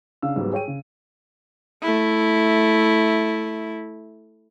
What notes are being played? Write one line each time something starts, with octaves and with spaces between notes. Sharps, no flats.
C#3 D4 F5 E6
G#2 F#3 G3 B3
G#4 C#5 G5 D#7
C#3
A3 E4